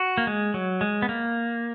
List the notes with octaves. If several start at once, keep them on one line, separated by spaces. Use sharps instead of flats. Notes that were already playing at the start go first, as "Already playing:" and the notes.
Already playing: F#4
A#3
G#3
F#3
G#3
B3
A#3